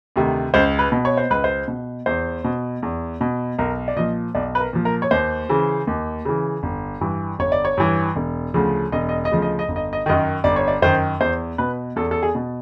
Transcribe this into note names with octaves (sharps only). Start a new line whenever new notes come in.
D2 C3 D#3
C#2 C5
B4
B2
C#5
C5
C#2 B4
C5
B2
E2 C5
B2
E2
B2
B1 A#4
D5
A#2 F3 D#5
B1 D5
B4
A#4
A#2 F3
A#4
C#5
D#2 C5
C#3 E3
D#2
C#3 E3
G1
G2 E3
G1 C#5
D5
C#5
G2 E3
E1
D2 C#3 F3
E1 D#5
D#5
D#5
D2 C#3 F3
D#5
D#5
G1
D#5
D#5
F#2 D#3 D#5
G1 D5
C#5
D5
F#2 D#3 C5
E2 C5
B2 B4
E2 A4
A4
G#4
B2